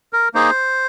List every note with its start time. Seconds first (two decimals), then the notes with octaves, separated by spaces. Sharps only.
0.13 A#4
0.34 A#3 D#4 G#4 C5